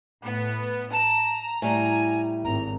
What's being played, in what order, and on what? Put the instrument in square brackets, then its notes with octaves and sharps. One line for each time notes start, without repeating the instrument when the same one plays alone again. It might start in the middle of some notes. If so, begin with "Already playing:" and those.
[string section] A2 B3
[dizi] A5 [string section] A#5
[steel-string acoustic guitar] A2 G3 [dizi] G#5
[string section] G#1 [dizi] A#5